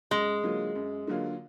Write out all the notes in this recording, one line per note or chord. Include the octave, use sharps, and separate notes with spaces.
F#2 G#3
D3 F#3 A#3 F4
F#2
D3 F#3 A#3 F4